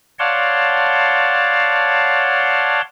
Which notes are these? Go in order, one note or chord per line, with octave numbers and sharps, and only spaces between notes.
C#5 D5 F5 F#5 A5 C6